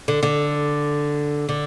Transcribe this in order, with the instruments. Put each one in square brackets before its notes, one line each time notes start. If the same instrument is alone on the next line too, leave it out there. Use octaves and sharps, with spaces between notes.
[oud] D3
D3
D3